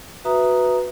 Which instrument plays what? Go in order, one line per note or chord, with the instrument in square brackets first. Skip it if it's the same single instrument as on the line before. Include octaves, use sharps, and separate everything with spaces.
[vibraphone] F#4 B4 E5 A#5 D#6